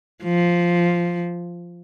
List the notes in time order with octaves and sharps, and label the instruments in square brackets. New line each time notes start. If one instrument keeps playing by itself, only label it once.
[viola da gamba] F3